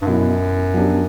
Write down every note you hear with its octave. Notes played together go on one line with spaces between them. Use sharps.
G2
F#2 B2 F#3 B3 E4
F#3 B3 D4 G4